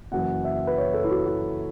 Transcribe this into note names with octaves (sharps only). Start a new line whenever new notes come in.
F#1 F#2 E3 F#5
E5
B4
C#5
A4
E4
F#4
F#4